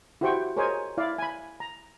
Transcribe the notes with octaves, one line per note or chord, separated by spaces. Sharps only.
E4 F#4 G4 C5 G5 C#6
G#4 A#4 C5 C#5 D#5 G#5
E4 D5 F5
G#5 B5
A#5